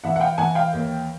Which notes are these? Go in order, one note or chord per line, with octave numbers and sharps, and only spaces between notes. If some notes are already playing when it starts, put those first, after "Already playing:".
E3 E5 F#5
F#5
F5 G5
E3 F#5 G#5
F5 G5
D#2